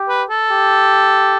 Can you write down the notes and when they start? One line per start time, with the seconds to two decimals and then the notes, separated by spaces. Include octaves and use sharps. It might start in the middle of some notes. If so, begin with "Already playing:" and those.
Already playing: G4
0.09 B4
0.30 A4
0.51 G4